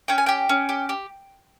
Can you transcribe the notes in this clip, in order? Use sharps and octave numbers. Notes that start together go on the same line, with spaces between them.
C#4 G5
G#5
G4 G5
C#4
G4
G4